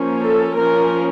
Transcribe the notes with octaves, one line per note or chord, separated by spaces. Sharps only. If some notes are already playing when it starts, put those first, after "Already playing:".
Already playing: F3 A#3 C#4
A4
F3 A#3 C#4 A#4